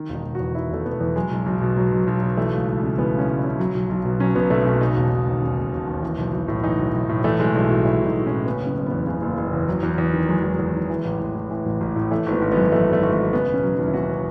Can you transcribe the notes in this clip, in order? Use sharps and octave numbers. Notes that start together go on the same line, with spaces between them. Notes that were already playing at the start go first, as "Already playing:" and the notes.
Already playing: D#3
E1
D#4
E1
F#4
E2
D#3 E4
E1 A3
E1 B3
E2
F#3 G#3
B1
B1
B2
F#3
B1
B1
B2
E3 A3
C#2
C#2
C#3
E3 B3
C#2 C#4
C#2
E4
C#3
F#3
B1
B1
B2
F#3 C#4
B1 B3
B1 A3
B2 C#4
C#3 D#4
E1
E1
D#2
C#3
E1
E1
D#2
E3
B1
B1
A2
E3 D#4
B1
B1
A2
E3 A3
B1 G#3
B1 A3
A2 F#4
E3 E4
B1
D#4
B1
A2 C#4
C#3 B3
F#1
C#4
F#1
B3
E2
C#3
F#1
F#1
E2
F#3
E2
E2
D#3
F#3 G#3
E2
E2
D#3
E3
A1
A1
A2
E3
A1
A1
A2
E3 A3
G#1
B3
G#1
B3
F#2
E3 A3
G#1
A3
G#1
F#2 A3
C#3 B3
E1
C#4
F#3
D#4
D#2
E4
C#3 F#4